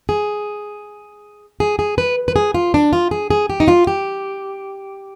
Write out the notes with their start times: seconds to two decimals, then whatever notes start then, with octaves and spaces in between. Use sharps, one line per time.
0.09 G#4
1.60 G#4
1.79 G#4
1.98 B4
2.28 B4
2.36 G#4
2.54 F4
2.74 D4
2.93 F4
3.11 G#4
3.30 G#4
3.50 G4
3.60 D#4
3.68 F4
3.87 G4